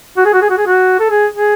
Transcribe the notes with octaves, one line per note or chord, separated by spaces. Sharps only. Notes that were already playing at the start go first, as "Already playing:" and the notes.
F#4
G#4
F#4
G#4
F#4
G#4
F#4
A4
G#4
G#4